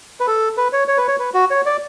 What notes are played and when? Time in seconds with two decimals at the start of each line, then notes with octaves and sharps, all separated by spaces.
0.20 B4
0.27 A4
0.57 B4
0.73 C#5
0.88 C#5
0.97 B4
1.08 C#5
1.19 B4
1.34 F#4
1.51 C#5
1.66 D5